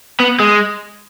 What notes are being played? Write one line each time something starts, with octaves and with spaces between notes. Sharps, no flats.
B3
G#3